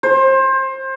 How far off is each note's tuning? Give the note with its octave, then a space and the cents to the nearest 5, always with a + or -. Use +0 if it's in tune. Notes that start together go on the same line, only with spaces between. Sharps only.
C5 +25